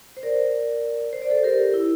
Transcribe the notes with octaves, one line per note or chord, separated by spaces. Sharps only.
C5
A#4 D5
C5
D5
A4 C5
G4 A#4
E4